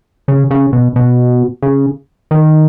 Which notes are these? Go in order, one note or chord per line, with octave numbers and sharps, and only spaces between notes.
C#3
C#3
B2
B2
C#3
D#3